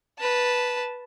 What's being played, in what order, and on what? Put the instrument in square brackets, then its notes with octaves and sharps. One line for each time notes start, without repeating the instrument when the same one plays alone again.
[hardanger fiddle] B4 A5